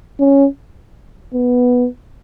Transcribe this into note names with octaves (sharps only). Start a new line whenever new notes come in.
C#4
B3